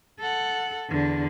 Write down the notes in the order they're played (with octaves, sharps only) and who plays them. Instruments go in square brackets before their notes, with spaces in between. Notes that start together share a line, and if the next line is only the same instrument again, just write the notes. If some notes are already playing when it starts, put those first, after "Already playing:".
[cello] A4 F#5
E2 D3